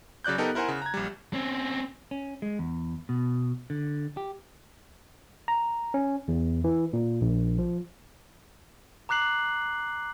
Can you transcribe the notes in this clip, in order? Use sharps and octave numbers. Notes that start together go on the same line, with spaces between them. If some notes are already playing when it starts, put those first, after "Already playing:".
C#3 F#3 D5 F#6 G6
B3 D#4 G4 A4 A#4
E4 A#4 C5 F#5 G#5
C#3
A#5 G#6
A#1 G3
C4 C#4
C#4
G#3
E2
B2
D3
G4
A#5
C#4
E2
E3
A#2
A#1
F3
A#5 D6 F#6 C7 F#7